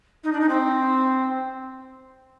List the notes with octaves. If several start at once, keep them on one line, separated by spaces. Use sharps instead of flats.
D#4
D4
D#4
C4